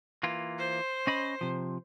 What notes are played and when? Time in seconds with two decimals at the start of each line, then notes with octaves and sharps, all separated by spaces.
0.23 E3 A#3 F4
0.59 C5
1.07 C#4 D#5 B5
1.41 C3 F3